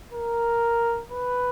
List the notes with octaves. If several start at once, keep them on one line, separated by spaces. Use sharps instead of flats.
A#4
B4